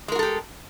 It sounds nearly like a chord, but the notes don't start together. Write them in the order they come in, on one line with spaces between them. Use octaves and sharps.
G#3 A#4 F#4 A4 G4